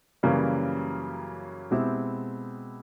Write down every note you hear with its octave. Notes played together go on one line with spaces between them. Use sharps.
F#2 C#3 E3 G3 A#3
B2 G#3 C4 E4 G4